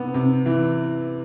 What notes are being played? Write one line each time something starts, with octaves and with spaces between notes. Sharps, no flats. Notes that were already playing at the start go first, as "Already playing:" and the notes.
Already playing: C3 B3
C3
E3